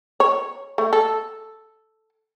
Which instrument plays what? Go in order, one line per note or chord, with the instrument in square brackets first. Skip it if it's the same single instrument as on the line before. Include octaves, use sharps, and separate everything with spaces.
[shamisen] C#5
A3
A4